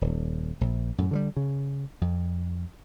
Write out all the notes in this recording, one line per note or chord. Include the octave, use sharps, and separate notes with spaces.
D#1
A#1
F#2 A2
D3 E3 G3
C#3
F2